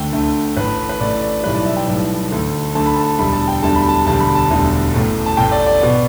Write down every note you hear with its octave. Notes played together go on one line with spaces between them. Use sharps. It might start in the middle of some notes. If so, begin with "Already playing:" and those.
Already playing: D2 D3 A3 G5
D2 D3 A3
A1 A2 E3 A3 B4
B4
A1 A2 E3 A3 D5
D5
B1 A2 E3 G3 B4
D5
E5
G5
B1 A2 E3 G3
D2 D3 A3
D2 D3 A3 A5
B5
A5
E1 D2 D3 G3 B5
A5
G5
E1 D2 D3 G3 A5
B5
A5
E1 D2 D3 G3 A5
B5
A5
E1 D2 D3 G3
A1 A2 A3
A5
A1 A2 A3 G5
D5
D5
B2 B3